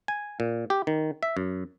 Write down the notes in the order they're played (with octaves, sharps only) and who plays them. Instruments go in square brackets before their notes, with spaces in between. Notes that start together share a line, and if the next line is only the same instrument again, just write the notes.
[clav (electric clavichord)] G#5
A#2
G4
D#3
E5
F#2